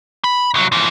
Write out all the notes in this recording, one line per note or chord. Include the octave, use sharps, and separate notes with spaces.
B5
C2 F#3
E3 F3